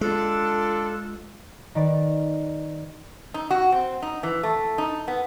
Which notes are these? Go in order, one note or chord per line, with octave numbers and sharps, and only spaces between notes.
G#3 D4 F4 A4
D#3 B4 D5
D#4
F#4
C4
D#4
E3
A3
D#4
B3